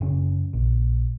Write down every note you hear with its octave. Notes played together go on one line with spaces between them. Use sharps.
F#1 C#3
A#1